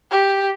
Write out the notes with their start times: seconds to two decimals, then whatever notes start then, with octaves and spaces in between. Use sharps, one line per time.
0.11 G4